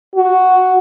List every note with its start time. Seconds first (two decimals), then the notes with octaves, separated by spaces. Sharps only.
0.15 F#4